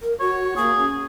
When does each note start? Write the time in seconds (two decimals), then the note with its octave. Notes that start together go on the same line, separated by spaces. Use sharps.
0.01 A#4
0.20 F#4 C#5
0.57 A#3 G#4
0.78 C#4